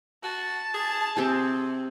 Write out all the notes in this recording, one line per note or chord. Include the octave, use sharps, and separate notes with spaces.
F#4 A5
G#4
C3 C4 G4 G#4